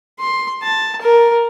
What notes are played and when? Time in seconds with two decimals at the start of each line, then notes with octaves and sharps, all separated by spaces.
0.20 C6
0.62 A5
1.02 A#4